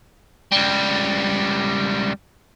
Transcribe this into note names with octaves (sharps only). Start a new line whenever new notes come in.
C#2 G3